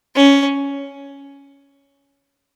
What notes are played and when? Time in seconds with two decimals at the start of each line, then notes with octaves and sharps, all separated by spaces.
0.15 C#4